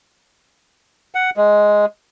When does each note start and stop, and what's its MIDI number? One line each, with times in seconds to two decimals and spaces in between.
1.15 1.30 78
1.37 1.85 56